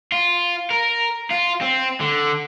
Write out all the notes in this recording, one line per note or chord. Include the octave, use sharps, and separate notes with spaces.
F4
A#4
F4
C4
D3